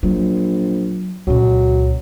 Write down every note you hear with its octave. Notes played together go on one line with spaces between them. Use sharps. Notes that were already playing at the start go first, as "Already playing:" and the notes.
A#1 F#3
C#2 A#2 F#3